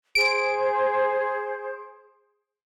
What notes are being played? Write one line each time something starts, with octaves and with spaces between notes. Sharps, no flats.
G#4 C5 D7